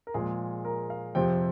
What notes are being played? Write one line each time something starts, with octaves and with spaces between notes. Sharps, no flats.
A#4
A#2 F3 G#3 G#4
A#4
F5
F2 C3 F3 C4 G5